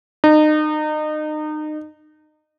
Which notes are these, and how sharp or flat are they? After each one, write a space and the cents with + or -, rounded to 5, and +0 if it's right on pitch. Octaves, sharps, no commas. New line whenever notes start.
D#4 -30